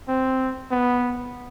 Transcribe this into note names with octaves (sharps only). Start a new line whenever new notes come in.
C4
B3